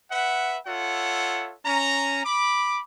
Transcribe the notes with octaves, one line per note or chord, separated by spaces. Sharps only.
B4 E5 F#5
F4 A4 C#5 E5 F#5
C#4 A#5
B5 D6